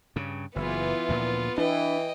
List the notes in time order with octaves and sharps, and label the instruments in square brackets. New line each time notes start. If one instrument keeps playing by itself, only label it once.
[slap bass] G2 C#3
[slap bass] F#1 [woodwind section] E3 [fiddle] B3 F4
[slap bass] D2 A#2 F3
[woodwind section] E3 [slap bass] D4 [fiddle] D#5 G5